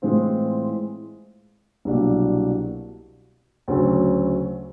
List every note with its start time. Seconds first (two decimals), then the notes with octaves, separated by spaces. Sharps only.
0.02 A2 E3 G#3 C4 F4
1.85 C2 B2 F#3 A#3 D4
3.68 D2 C#3 F#3 A3 C#4